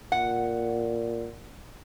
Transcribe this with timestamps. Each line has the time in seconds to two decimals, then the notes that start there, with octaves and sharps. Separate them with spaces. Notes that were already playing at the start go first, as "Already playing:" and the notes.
0.12 A#2 F#5